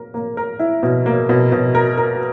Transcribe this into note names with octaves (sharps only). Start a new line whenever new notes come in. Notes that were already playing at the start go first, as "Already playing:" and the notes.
Already playing: A#3 A#4
A#3
A#4
E4
B2
A#3
B2
B2
A#4
A#4